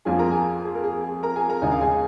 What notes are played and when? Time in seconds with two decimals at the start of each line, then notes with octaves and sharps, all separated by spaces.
0.05 F2 F3 A#3 F4 G#4 G#5
0.19 A#4 A#5
0.31 G#4 G#5
0.65 G#4
0.74 A#4
0.84 G#4
1.04 G#4
1.23 A#4 A#5
1.36 G#4 G#5
1.49 A#4 A#5
1.61 D#2 C#3 G#3 D#4 G#5
1.71 F5
1.81 G#4 G#5